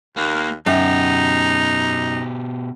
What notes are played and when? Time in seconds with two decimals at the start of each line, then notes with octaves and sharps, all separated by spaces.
0.17 D#2 A#3
0.66 F#2 B2 D#4 G4